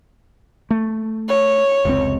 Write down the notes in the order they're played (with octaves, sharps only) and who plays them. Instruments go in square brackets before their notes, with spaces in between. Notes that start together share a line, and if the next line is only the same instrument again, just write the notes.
[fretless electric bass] A3
[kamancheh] C#5
[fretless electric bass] F1 C#2 C4